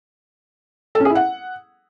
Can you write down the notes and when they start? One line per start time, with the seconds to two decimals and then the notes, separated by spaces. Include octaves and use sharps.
0.95 A4
1.00 C#4
1.05 G#4
1.10 E4
1.15 F#5